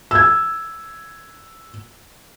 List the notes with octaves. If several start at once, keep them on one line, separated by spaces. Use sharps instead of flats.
E6 G#6